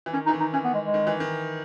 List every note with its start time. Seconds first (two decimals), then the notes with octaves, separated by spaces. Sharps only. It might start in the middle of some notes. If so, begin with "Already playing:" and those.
0.06 E3
0.13 D#3 C#4
0.26 D#4
0.29 E3
0.33 D#3
0.40 D#4
0.53 E3 C#4
0.64 B3
0.74 G#3
0.84 G#3
0.94 D#3
1.07 E3
1.20 D#3